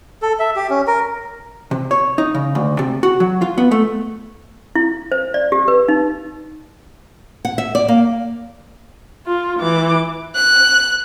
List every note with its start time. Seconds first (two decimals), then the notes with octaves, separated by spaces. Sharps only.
0.22 A4
0.39 E5
0.56 G4
0.70 C#4
0.87 A#4
1.71 C3
1.91 C#5
2.18 D#4
2.34 C#3
2.55 D2
2.79 C3
3.03 F#4
3.20 F#3
3.42 F4
3.58 B3
3.71 A3
4.75 E4
5.12 C5
5.34 D5
5.52 G4
5.68 B4
5.88 D#4
7.45 F#5
7.58 E5
7.75 D5
7.88 A#3
9.27 F4
9.59 E3 D6
10.36 F#6